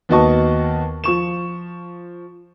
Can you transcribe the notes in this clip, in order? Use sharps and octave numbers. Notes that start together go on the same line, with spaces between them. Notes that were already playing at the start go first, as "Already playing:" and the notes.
D#2 B3 F#4 D#5 A5 C#6
F3 C#6 E7